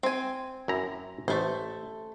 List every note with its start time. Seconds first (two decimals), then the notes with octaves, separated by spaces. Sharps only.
0.03 C4 G#5
0.68 F#2 E4 A#5
1.28 A1 A3 C5